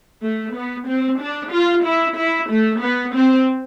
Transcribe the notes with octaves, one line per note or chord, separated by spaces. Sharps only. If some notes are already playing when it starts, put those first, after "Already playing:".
A3
B3
C4
D4
F4
E4
E4
A3
B3
C4